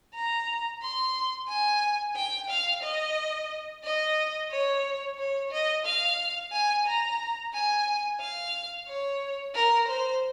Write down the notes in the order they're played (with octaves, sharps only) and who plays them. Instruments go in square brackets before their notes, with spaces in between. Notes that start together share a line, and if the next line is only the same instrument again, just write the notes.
[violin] A#5
C6
G#5
G5
F5
D#5
D#5
C#5
C#5
D#5
F5
G#5
A#5
G#5
F5
C#5
A#4
C5